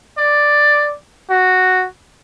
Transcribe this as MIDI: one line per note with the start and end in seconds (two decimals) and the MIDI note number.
0.18 0.93 74
1.30 1.86 66